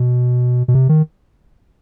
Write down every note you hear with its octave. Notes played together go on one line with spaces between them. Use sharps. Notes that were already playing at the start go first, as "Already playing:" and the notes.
Already playing: B2
B2
C3
D#3